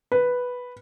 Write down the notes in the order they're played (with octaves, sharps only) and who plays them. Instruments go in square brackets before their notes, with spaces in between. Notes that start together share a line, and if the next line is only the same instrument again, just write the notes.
[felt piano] B4